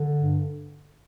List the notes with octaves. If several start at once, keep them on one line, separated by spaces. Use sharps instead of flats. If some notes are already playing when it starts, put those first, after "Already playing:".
Already playing: D3
G2